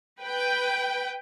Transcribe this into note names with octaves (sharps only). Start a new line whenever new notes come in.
B4 G5